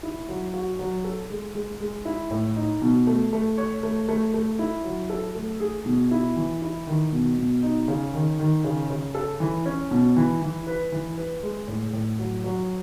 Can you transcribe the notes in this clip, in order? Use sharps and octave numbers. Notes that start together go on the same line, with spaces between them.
E4
F#3
F#4
F#3
A4
G#3
G#3
G#3
E4
A2
D#4
B2
A3
A3
C#5
A3
A3
A3
E4
F#3
A4
A3
G#4
B2
E4
E3
E4
D#3
B2
B2
D#4
C#3
D#3
D#3
C#3
C#3
A4
E3
C#4
B2
E3
E3
B4
E3
B4
G#3
A2
A2
F#3
F#3